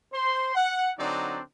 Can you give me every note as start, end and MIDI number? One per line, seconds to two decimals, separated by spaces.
0.12 0.52 72
0.12 0.52 84
0.55 0.91 78
0.98 1.40 50
0.98 1.40 54
0.98 1.40 60
0.98 1.40 62
0.98 1.40 63
0.98 1.40 74